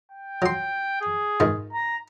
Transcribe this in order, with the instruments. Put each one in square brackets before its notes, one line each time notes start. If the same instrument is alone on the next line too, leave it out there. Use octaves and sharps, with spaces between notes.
[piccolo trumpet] G5
[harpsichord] F#3 C6
[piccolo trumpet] G#4
[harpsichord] G#2 D#3
[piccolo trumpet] A#5